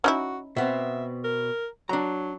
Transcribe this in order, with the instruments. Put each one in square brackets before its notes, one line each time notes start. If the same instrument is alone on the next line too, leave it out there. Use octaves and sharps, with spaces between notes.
[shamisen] C#4 D#4 E4 [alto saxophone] F#4
[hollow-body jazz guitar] B2 B3 C4 [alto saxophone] E5
[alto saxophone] A#4
[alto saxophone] F#3 [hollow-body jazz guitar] D4 A#5